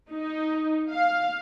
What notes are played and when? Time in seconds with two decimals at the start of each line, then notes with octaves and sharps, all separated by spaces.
0.11 D#4
0.90 F5